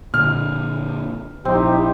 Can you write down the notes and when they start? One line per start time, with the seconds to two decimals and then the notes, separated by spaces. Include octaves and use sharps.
0.14 A#2 D3 F6
1.45 A#1 C4 D#4 E4 G4